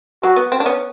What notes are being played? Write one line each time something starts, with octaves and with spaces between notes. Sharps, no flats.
F#3 F#4
B3
C4
D4
B3 C#4